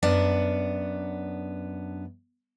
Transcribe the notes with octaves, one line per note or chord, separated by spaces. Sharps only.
F#2 B3 D4 F#5